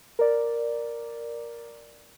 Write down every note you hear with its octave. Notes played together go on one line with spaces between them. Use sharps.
A#4 D5